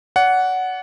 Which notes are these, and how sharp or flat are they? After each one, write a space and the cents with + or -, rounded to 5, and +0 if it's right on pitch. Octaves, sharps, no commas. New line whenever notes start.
D5 -45 F#5 +0